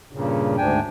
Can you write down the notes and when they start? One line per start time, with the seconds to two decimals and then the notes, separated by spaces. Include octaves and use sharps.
0.13 G2 A#2 C#3
0.58 D2 G#2 D4 G5 G#5